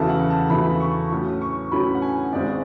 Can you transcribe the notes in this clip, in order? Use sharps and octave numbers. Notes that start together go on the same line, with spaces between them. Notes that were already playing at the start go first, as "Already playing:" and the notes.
Already playing: E2 C#3 F#3 A3 E4 A5
F#5
A5
E2 C#3 F#3 A3 E4 B5
C#6
A2 F#3 C#4
C#6
A2 F#3 C#4 B5
F#5
G#5
G#1 G#2 G#3 D5